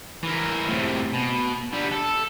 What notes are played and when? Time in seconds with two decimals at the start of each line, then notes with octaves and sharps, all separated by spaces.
0.23 E3 A#4
0.68 A2 C3
1.13 B2
1.73 D3 G3
1.92 A4